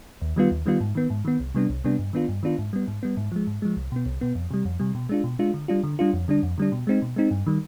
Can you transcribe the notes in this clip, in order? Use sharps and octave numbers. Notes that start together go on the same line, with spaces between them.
D#2
D#3 G3 B3 F4
D#2
D#3 G3 B3 F4
G#2
D#3 B3
G#2
D#3 B3
C2
C3 G3 B3 D4
C2
C3 G3 B3 D4
G2
D#3 B3 D4 F4
G2
D#3 B3 D4 F4
G#2
G3 B3
G#2
G3 B3
G#2
F3 G#3
G#2
F3 G#3
C2
B2 B3
C2
B2 B3
F2
C3 G3
F2
C3 G3
B2
G#3 D4 F4
B2
G#3 D4 F4
D3
G3 D4 F4
D3
G3 D4 F4
F2
D3 G3 D4
F2
D3 G3 D4
B2
G#3 C4 D#4
B2
G#3 C4 D#4
G2
D#3 G3